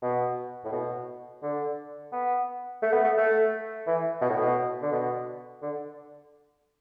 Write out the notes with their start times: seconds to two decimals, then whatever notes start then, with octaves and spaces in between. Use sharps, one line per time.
0.02 B2
0.65 A2
0.72 B2
1.43 D3
2.12 B3
2.82 A3
2.93 B3
3.04 A3
3.17 A3
3.87 E3
4.21 B2
4.30 A2
4.38 B2
4.82 D3
4.92 B2
5.62 D3